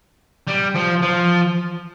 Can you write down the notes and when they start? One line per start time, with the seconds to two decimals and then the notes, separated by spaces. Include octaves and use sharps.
0.48 G3
0.75 F3
1.03 F3